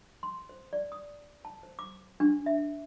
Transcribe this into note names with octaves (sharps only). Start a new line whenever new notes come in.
C6
C5
D5
D#6
A5
C5
D6
D4
E5